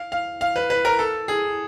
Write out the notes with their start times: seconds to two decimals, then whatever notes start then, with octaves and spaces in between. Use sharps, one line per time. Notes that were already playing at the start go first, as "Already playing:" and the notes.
Already playing: F5
0.12 F5
0.41 F5
0.56 B4
0.70 B4
0.85 A#4
0.99 A4
1.28 G#4